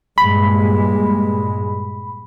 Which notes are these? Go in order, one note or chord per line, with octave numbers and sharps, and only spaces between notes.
G2 A#2 G#3 B5